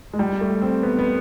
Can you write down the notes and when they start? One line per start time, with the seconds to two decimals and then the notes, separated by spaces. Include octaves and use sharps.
0.13 G#3
0.19 G3
0.41 A3
0.62 C4
0.83 B3
0.99 B3